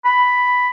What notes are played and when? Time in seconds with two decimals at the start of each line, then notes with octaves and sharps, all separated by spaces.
0.05 B5